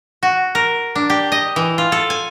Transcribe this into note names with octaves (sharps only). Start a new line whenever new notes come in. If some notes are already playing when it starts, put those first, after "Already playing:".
F#4
A#4
D4
G4
D#5
E3
F4
A4
G#5